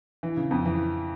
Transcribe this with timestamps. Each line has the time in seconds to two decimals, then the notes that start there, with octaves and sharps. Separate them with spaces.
0.23 E3
0.37 C#3
0.51 F2
0.65 E3